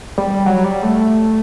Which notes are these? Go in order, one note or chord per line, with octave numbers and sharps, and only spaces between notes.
G3
F#3
G3
A3